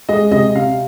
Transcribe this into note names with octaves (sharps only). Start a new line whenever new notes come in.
G#3 D#5
C3 D#5
C3 F5